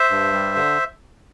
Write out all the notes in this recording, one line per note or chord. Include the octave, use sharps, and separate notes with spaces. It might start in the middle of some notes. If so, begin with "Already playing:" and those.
Already playing: C5 E5
G2
G3
D3